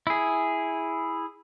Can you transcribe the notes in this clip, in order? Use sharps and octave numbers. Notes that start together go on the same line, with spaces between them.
E4 G#4